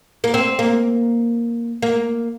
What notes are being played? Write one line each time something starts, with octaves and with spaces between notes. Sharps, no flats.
A#3
C4
A#3
A#3